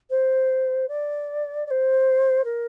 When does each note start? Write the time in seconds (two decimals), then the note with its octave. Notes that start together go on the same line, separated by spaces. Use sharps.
0.10 C5
0.88 D5
1.67 D5
1.71 C5
2.44 A#4